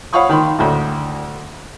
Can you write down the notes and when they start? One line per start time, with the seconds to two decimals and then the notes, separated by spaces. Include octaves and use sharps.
0.13 C#5 F5 F#5 B5 C#6 D#6
0.29 D#3 B5 C6
0.59 D2 A2